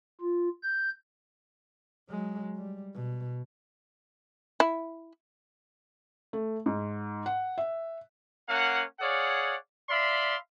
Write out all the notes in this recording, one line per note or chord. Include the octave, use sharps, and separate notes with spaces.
F4
G6
F#3 G#3
G3
B2
E4
A3
G#2
F#5
E5
A#3 C#4 F5 F#5
G#4 C#5 D5 F5 F#5
D5 E5 F5 B5 C6